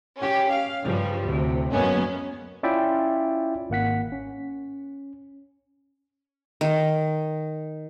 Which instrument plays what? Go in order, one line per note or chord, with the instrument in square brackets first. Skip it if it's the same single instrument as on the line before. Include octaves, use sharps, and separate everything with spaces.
[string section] C#4 G4
F5
G2 C#3 F3 G3
D2 A2 C3
F#2 F#3 G#3 A#3 B3 C#4
[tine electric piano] C#4 E4 F4 D5 E5 G5
G#1 A#3 F#5 B6
C#4
[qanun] D#3